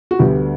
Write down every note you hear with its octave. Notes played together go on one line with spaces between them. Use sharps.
F#4
D2 D3 G3 B3 G4